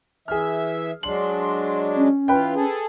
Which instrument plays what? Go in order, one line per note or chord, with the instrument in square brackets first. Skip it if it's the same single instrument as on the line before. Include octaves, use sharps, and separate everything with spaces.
[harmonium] E3 E5 [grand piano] G#4 F6
[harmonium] F#3 G#3 D4 [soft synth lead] C6 [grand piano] F#7
[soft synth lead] C#4
[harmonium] E3 F4 [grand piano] B4 G5
[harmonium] G#4 A4